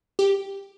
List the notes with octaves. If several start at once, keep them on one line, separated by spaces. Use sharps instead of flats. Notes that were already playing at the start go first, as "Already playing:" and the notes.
G4